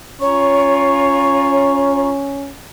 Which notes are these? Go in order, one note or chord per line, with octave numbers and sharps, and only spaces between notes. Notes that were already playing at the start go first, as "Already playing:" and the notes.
C#4 F4 C#5 A#5 C#6